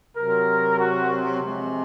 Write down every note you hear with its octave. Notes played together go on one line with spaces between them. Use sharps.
C3 F#3 A#4
F#4
C3 F3 G#3